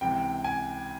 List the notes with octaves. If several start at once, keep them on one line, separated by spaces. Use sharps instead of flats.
C#2 C3 E3 G5
G#5